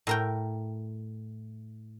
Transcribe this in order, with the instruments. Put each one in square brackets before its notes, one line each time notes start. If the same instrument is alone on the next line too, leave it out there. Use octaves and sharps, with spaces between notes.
[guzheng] A2 A#4 G5